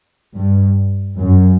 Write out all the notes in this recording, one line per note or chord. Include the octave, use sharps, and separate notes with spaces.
G2
F#2